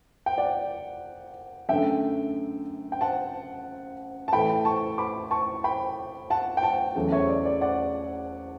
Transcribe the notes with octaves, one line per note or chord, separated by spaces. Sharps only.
G5
D5 F#5
F#2 D3 A3 E5 G5
G5
F#5 A5
A5
A2 E3 A3 G5 B5
A5 C#6
B5 D6
A5 C#6
G5 B5
F#5 A5
G5
F#5 A5
E2 C#3 F#3 A3
C#5 E5
D5
D5
D5 F#5